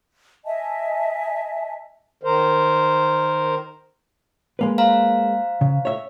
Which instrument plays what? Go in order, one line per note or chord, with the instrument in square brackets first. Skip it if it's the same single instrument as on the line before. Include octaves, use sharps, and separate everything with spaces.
[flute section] D#5 E5 G#5 A5
[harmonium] D#3 A#4 C5
[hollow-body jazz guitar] G#3 A#3 B4
[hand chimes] C5 F5 A#5
[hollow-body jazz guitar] C#3
C#5 E5